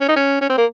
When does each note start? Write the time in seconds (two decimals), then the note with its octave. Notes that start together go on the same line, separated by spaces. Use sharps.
0.01 C#4
0.08 D#4
0.16 C#4
0.41 C#4
0.50 C4
0.57 A#3